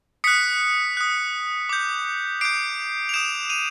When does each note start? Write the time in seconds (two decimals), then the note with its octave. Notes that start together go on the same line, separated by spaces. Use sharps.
0.24 D#6 F#6 B6 C#7
0.97 D#6 F#6
1.69 D6 G6
2.41 D6 G6 C7 D7
3.09 F7
3.13 D#6 G6 D7 E7
3.50 D#7 F7